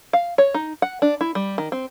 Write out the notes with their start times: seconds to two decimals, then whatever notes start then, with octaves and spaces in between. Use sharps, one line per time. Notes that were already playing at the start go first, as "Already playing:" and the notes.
0.13 F5
0.38 C#5
0.54 D#4
0.82 F#5
1.02 D4
1.21 E4
1.35 G3
1.58 D#3
1.72 C4